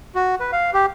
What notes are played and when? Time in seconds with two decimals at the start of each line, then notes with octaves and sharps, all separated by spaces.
0.15 F#4
0.40 B4
0.52 F5
0.74 G4